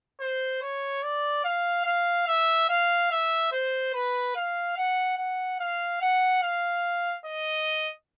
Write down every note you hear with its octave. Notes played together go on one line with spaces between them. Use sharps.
C5
C#5
D5
F5
F5
E5
F5
E5
C5
B4
F5
F#5
F#5
F5
F#5
F5
D#5